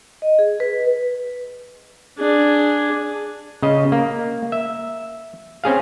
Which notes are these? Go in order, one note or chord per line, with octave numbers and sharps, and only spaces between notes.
D#5
G#4
B4
D4 G#4
C#3 D#5
A#3
E5
C4 C#4 G#4 F5